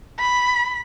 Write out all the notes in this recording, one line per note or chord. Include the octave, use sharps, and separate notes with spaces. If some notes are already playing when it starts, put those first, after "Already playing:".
B5